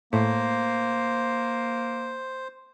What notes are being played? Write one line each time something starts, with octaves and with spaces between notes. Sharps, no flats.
A2 A#3 C5